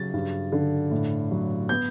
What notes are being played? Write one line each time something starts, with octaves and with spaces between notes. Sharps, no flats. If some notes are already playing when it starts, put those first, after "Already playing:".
Already playing: C#3 F#3 A6
G2
D3
A2
F#3
B3 G6